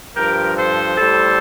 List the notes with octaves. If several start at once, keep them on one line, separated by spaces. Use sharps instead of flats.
G2 F3 G4 A#4
A4 C5
A2 G3 A4 C5